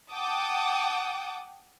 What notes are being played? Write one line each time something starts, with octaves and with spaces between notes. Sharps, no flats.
F#5 G5 A5 D6 D#6